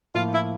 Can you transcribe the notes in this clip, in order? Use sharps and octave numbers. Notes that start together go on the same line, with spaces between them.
A2 F3 A#3 F4
E4